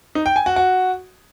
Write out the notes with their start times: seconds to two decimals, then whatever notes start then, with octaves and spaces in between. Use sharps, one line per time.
0.15 D#4
0.26 G5
0.36 G#5
0.46 F#4
0.56 F#4